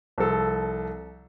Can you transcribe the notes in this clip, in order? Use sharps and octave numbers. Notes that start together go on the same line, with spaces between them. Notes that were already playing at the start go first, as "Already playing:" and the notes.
C2 F3 A4